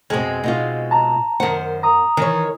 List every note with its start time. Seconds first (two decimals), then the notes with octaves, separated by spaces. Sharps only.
0.10 F2 B2 G#3 C4
0.44 B2 D#4 F4
0.91 A5 A#5
1.40 F#2 D#3 C5 F#5
1.83 A#5 D#6
2.17 D#3 E3 C#5